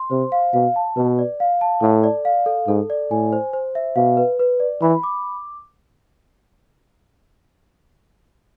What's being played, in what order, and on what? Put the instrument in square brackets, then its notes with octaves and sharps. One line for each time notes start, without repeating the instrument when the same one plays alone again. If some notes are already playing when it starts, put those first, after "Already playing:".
Already playing: [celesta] C6
[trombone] C3 [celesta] C5
[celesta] F5
[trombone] B2 [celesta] F5
[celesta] A5
[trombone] B2 [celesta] B4
[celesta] D5
F5
A5
[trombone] A2 [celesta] A4
[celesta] D5
F5
A4
[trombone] G#2 [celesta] A4
[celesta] D5
[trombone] A2 [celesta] G#5
[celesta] C5
C5
E5
[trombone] B2 [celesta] F5
[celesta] B4
B4
D5
[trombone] E3 [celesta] B5
[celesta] D6